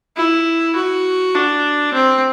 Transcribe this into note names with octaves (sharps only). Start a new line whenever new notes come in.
E4
F#4
D4
C4